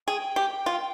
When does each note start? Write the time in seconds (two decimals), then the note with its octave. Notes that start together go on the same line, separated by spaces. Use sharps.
0.07 G#4 G5
0.36 G4
0.66 F4